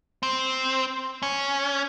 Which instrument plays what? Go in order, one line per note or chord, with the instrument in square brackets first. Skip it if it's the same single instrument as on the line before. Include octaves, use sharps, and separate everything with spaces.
[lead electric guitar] C4
C#4